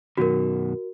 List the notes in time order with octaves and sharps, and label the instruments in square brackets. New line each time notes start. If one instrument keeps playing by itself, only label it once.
[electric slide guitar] F#2 B2 D#3 [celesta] F#4 A#4